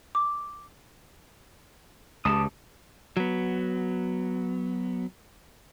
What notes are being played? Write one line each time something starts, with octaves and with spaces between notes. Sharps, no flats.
D6
C#2 G4 A5 D#6
F#3 B3